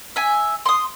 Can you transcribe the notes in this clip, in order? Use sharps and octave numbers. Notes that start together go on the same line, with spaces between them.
E5 G#5
C6 D#6